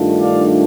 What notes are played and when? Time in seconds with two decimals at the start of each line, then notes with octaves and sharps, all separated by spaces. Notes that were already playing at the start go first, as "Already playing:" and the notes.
Already playing: G2 D#3 A3 D4 F4
0.20 D5 F5